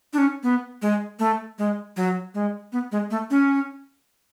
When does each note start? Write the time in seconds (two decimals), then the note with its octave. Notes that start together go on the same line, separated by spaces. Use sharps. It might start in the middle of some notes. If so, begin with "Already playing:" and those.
0.13 D4
0.18 C#4
0.43 B3
0.82 G#3
1.19 A3
1.59 G#3
1.96 F#3
2.34 G#3
2.72 B3
2.92 G#3
3.11 A3
3.30 C#4